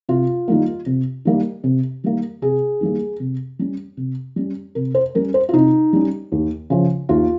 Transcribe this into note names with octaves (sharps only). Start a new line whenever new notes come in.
C3 F4
D#3 G3 A#3
C3
D#3 G3 A#3
C3
D#3 G3 A#3
C3 G#4
D#3 G3 A#3
C3
G3 C#4
C3
G3 C#4
C3 A#4
C5
G3 C#4 A#4
C5
F4
C3 D#4
G3 C#4
D#2
C#3 F3
D#2 F4